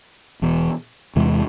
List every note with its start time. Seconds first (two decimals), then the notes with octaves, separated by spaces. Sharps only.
0.42 E1 E2 B2
1.16 E2 C3 E3 G#3